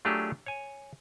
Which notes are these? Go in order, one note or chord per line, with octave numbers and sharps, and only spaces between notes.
F#3 A3 D4 F4 G4 G#4
C#5 G#5